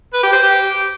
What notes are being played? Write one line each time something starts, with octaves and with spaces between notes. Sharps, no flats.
B4
G4
C5
G4